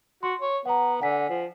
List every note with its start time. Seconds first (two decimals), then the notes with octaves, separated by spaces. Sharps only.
0.23 F#4 C6
0.41 C#5
0.66 B3 F#5 A#5
1.01 D3 F#5 G#5 B6
1.30 F3